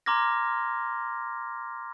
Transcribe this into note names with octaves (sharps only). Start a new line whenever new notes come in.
A#5 C6 D6 F6 G#6 A#6